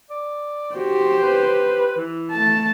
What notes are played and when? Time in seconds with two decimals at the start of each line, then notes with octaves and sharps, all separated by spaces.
0.10 D5
0.75 F#4 G4 C5
1.22 B4
1.97 E3
2.32 A3 A5